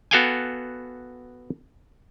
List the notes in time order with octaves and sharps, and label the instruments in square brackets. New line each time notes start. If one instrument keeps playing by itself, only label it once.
[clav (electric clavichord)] B3 F#4 A4 F5 G5 G#5